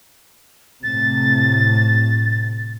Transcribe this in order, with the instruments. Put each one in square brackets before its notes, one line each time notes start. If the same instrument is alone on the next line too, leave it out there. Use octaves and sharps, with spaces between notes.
[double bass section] A2 C3 [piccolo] A6